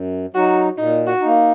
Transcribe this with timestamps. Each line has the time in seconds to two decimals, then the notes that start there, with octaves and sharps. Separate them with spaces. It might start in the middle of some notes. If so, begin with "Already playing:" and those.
Already playing: F#2
0.34 F#3 D#4 F#4
0.78 A#2 D#4
1.07 F#4
1.21 A#3 D#4